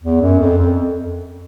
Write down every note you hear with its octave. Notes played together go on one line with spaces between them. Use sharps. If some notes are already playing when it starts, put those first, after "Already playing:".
E2
F#2
F2
F2